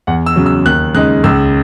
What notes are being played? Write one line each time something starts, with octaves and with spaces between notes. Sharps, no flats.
E2 F#5
E6
C#3 F#3
E6
D#2 F#6
C#3 G#3 D#4 F#6
C#2 E6